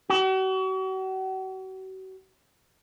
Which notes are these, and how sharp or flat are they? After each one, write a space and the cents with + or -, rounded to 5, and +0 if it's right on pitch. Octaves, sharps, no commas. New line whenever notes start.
F#4 +40